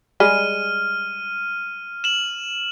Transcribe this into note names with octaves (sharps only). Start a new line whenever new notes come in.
G3 G#3 G#4 F6 D#7
E7 F#7